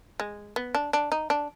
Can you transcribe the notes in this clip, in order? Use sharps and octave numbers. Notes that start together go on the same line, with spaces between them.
G#3
B3
D4
D4
D#4
D4